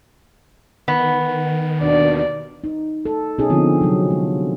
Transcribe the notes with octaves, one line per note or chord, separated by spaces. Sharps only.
D#3 B3
D#2 B2 D4 D5
D#4
A4
B2 C#4 D#4 G#4
D3 F3 C4 D#4 F4
C3 F#3
G#3